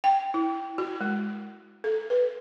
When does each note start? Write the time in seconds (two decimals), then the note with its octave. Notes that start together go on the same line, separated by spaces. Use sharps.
0.04 G5
0.34 E4
0.78 F#4
1.01 G#3
1.84 A4
2.10 B4